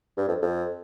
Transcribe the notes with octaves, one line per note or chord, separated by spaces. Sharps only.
G2
F2
F2